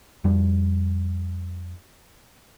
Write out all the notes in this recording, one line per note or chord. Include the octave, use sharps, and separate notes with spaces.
F2 G3